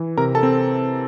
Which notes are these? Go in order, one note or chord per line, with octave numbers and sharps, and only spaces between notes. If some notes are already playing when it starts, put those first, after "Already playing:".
Already playing: E3
C3 A#4 A#5
A4 A5
C4